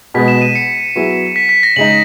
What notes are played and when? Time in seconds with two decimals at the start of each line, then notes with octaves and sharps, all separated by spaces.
0.14 B2 G#3 B3 B6
0.28 E7
0.41 D#7
0.55 C#7
0.95 F#3 B3 E4 G#4
1.36 B6
1.49 B6
1.63 A#6
1.76 C#3 G#3 D#4 F#7